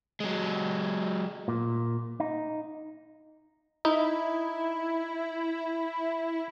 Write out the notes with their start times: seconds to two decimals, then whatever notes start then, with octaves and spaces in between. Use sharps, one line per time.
0.20 F#3 G#3
1.48 A#2
2.20 D#4
3.85 D#4 E4